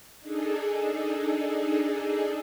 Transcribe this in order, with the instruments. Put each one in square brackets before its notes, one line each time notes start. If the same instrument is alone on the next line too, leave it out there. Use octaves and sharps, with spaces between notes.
[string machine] D4 D#4 G#4 A4